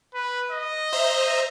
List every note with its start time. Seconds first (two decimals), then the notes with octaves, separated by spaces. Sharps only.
0.14 B4
0.51 D#5
0.92 C5 E5 A#5